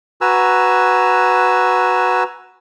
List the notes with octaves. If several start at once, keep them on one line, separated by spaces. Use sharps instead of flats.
F#4 B4 G#5 A#5 E6